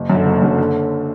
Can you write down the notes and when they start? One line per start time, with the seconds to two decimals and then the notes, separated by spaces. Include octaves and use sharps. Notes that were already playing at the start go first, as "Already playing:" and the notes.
Already playing: F#1
0.10 F#2 D3
0.26 F#1
0.42 F#2 D3
0.58 D3